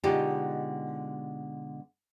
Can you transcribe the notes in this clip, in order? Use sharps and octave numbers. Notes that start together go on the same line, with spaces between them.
B2 D3 G#3 D#4 F4 G4